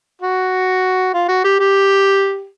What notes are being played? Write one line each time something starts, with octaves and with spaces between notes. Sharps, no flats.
F#4
F4
F#4
G4
G4